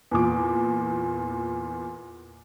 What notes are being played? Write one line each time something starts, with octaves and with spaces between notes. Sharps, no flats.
E2 A#2 D6